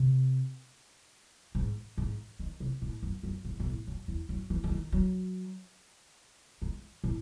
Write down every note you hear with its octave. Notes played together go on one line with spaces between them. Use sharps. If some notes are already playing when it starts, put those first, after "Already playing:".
Already playing: C3
G#2
G#2
D#3
C3
A2
F#2
F#2
G#2
G#2
A2
F#2
E2
F#2
E3
E3
D#3
F#3
G#3
A2